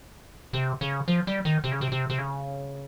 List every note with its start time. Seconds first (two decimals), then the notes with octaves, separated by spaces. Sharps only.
0.53 C3
0.81 C#3
1.08 F3
1.27 G3
1.45 D#3
1.64 C3
1.72 C#3
1.81 C3
1.92 C3
2.10 C3
2.18 C#3